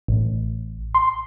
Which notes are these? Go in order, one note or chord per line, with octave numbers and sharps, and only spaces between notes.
A1
C6